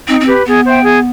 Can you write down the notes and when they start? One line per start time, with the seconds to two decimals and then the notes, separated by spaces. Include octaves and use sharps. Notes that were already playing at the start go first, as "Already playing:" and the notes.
0.08 C4 D#4
0.21 C4
0.27 G4 B4
0.46 B3 G#4
0.66 C5 E5 G5
0.84 G#4